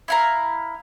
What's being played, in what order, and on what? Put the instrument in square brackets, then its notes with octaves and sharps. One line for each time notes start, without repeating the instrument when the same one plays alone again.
[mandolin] E4 F5 A#5